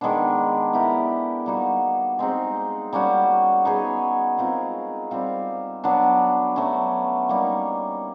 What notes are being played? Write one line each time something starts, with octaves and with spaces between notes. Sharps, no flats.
D#3 G#3 B3 D4
B3 E4 G4 A#4
G3 A#3 D#4 F#4
G#3 C4 D#4 G4
G3 A#3 C#4 F#4
B3 D#4 G#4 C#5
G#3 C4 F4 A#4
G3 C4 F4
F#3 B3 D4
F#3 A3 C#4
G3 A#3 D#4